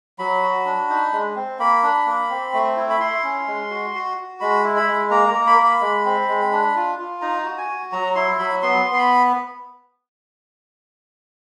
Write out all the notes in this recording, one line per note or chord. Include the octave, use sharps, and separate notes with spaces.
F#3 B5
F#4
D4
D#4
G#3
C4
A#3 B5
D4
A#3
C4
A3
E4
B5
E4 C6
C#4
G#3
F#4
F#4
F#4
G#3 B5
E4
B5
G#3
A#3 A#5
A#5
A#3
B5
A#3
B5
G#3
C4
G#3
D4
F4
F4
D#4 A#5
F#4
G#5
F#4
F#3 A#5
E4 C6
F#3 B5
B3 C6
B3
C6
B5